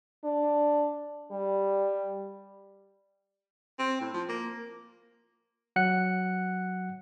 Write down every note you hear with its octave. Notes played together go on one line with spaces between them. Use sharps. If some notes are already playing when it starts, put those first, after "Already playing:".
D4
G3
C4
A2
F3
A#3
F#3 F#5 F#6 C#7